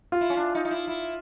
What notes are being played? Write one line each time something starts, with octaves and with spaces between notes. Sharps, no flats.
F4
E4
C#4
D4
D#4
D#4
E4
E4